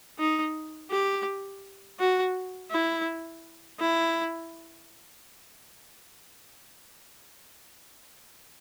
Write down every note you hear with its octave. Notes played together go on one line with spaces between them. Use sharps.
D#4
G4
F#4
E4
E4